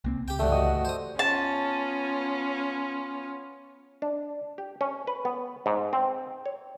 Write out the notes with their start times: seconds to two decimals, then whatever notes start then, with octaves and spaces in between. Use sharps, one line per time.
0.04 C2 A#3 C4
0.28 C#2 G4 G5
0.39 D2 G2 E3 A3 F#5
0.52 F#4 D#5
0.85 C5 D#6
1.19 B3 C#4 F4 A5
4.02 D4
4.58 G4
4.81 C#4
5.07 B4
5.25 B3
5.66 G#2
5.93 C4
6.46 C#5